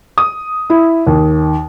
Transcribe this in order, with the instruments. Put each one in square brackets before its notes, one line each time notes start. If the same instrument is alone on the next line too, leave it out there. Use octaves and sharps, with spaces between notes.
[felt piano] D#6
E4
D#2